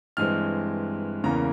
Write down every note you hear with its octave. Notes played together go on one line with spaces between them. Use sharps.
G2 E3 G#3 C4 F6
E2 C#3 E3 A#3 A#5